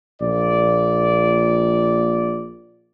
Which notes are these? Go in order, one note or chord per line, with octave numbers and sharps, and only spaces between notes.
A#1 A#2 D5